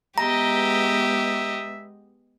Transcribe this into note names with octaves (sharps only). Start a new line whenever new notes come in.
G#3 B3 G4 D#5 E5 A#5